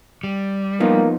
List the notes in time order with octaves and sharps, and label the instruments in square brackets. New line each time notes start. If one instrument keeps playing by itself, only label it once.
[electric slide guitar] G3
[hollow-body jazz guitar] F3 B3 D#4 [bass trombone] A#3